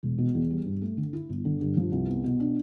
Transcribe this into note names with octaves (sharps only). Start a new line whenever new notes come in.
E1
B2
E2
G3
G2
A3
D3
E4
G1
D3
G2
F3
C2
B3
B2
D4